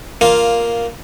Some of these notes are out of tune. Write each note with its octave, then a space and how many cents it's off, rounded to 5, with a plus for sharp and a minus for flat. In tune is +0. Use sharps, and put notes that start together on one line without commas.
A#3 +0 F4 -5